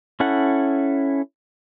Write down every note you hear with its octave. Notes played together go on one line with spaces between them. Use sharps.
C#4 E4 A4 F#5